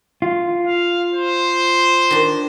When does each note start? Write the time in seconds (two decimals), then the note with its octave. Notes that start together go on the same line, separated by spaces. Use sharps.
0.22 F4
0.66 F5
1.14 C5
2.11 D#3 D4